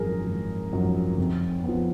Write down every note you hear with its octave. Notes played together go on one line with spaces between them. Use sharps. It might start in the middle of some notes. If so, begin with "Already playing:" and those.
Already playing: G#1 F#2 F3 G#4 A#4
G#1
F#2 F3
F2
F3 B3